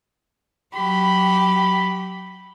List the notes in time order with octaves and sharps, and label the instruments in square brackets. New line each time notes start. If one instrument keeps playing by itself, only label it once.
[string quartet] F#3 G4 [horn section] B5